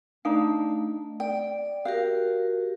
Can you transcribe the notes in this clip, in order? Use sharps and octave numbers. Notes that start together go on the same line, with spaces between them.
A3 D4 D#4 F5
D5 G5
F#4 G4 A#4 F5